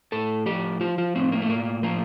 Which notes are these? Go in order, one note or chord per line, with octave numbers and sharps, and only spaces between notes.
A2 A4
F3 G4
F3 F4
F4
A2 C4
A#3
A3
A2 A#3
F3 A#3